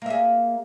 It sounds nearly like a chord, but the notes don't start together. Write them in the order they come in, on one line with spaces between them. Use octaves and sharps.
A#3 E5 G#4